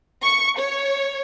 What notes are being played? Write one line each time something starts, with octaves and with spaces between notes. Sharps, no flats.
C#6
C#5